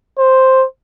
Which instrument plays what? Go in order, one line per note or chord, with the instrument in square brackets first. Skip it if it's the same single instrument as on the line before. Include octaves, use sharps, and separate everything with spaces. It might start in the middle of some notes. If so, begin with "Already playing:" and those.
[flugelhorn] C5